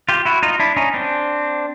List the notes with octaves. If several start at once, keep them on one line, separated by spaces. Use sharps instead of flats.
F4 G4
E4 F#4
D#4 F4
D4 E4
C#4 D#4
C4 D4